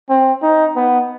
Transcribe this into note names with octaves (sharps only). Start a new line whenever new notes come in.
C4
D#4
B3